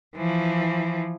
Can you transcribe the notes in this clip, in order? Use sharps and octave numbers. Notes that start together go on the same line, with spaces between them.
E3 F3